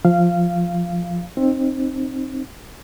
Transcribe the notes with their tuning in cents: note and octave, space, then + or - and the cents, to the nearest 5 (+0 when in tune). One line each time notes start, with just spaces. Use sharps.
F3 +0 F5 -15
C4 +15 D#4 -20